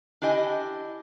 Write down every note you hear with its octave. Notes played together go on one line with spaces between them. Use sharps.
D4 E4 G4 D#5 G#5